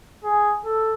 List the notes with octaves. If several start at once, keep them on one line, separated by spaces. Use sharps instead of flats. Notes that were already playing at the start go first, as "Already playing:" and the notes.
G#4
A4